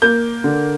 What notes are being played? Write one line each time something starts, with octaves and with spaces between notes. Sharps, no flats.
A#3 G6
D3